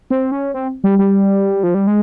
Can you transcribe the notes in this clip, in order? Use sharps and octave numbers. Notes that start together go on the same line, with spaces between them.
C4
C#4
C4
G3
G3
F3
G3
G#3